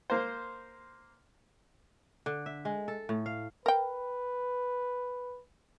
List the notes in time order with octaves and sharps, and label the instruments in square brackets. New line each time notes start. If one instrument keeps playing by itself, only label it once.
[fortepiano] A#3 C5
[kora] D3
E5
G#3
A4
A2
F5
[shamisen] A#4 G5 [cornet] B4